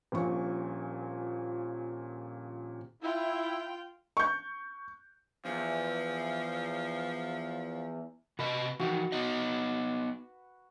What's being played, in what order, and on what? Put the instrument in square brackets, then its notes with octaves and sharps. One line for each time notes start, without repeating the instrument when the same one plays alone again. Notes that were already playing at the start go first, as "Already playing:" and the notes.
[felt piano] D#1 A#1 A#2 C#6
[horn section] E4 [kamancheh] F4 G5
[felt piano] C#6 G6
[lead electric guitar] E2 [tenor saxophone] F3
[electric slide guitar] C3 F#4 D#5 [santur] B4
[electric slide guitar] E3 F3 D#4 [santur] F#4
[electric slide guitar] B3 D#4 D#5